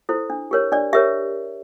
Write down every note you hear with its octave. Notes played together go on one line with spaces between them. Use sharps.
E4 A4 C5
D4
G4 A#4 C#5
D4 D5
G4 A#4 C#5 E5